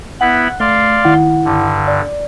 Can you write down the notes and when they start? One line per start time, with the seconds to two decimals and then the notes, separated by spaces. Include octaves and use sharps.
0.21 B3 E4 F#5 B5 F#6
0.60 A3 D5 F5 C6
1.05 D#3 E4 F#5
1.45 G2 D3
1.88 D5